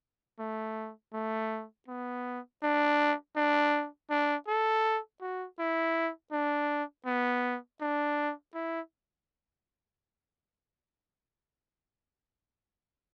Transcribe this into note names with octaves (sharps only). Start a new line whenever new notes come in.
A3
A3
B3
D4
D4
D4
A4
F#4
E4
D4
B3
D4
E4